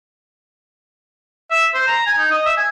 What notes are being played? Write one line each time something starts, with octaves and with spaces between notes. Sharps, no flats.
E5
C5
A#5
G#5
D#4
D#5
E5
G#5